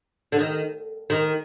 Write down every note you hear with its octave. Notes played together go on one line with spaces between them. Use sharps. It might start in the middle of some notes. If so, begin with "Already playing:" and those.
D3
D#3
D#3